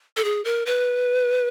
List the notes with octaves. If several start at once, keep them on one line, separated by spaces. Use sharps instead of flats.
A4
G#4
A#4
B4